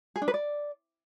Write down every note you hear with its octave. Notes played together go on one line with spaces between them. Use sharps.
G#4
D4
B4
D5